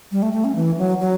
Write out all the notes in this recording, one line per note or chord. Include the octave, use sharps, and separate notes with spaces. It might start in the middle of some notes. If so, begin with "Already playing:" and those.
G3
A3
A3
C#4
E3
F#3
F#3